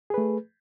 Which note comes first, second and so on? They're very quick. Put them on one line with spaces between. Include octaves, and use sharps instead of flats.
G#4 B4 A3